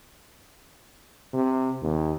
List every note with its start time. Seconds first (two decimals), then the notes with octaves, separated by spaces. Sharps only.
1.33 C3
1.82 D#2